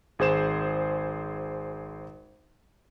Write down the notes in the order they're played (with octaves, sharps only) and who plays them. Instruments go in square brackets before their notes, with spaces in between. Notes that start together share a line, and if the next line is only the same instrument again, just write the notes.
[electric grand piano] G#1 G#4 C5 E7